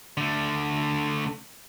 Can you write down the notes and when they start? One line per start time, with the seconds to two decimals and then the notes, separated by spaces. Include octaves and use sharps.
0.17 D3 A3